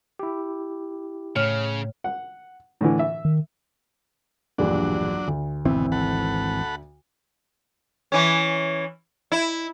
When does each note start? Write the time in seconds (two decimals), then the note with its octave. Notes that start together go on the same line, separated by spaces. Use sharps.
0.19 E4 G4
1.36 A2 C#3 C#5 F6
2.04 F#5
2.81 A2 D3 E3
2.99 E5
3.25 D#3
4.58 E1 A#1 G2 F#3 D4
5.27 D2
5.65 G#1 B2 E3 C4
5.92 A4 F#5 B5
8.12 E3 C#4
9.32 E4